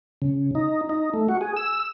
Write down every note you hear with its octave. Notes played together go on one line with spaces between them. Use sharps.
C#3
D#4
D#4
A3
F#4
G#4
E6